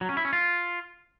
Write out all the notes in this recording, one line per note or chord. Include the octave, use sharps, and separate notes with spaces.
F#3
C#4
E4
C#4
F4